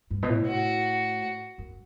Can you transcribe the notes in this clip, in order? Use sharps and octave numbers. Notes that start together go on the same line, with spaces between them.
G2
B2
A2
F#4
F#2